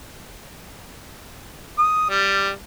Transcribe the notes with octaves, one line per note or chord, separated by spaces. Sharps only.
D#6
G3